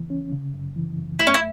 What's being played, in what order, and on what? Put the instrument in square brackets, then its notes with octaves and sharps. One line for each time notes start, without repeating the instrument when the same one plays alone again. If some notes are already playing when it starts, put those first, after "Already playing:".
Already playing: [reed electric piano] E2 C#3 E3
C#4
C#3
F#2
E3
F#2
[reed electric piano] A3 [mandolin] E4
[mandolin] C#4
E4